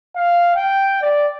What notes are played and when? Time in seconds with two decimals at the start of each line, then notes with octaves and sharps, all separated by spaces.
0.16 F5
0.55 G5
1.01 D5